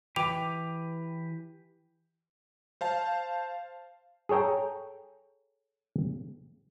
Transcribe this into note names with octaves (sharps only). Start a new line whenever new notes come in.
E3 G4 B4 G5 D6 F7
C5 F5 A5
G#4 A4 C#5 G5 A#5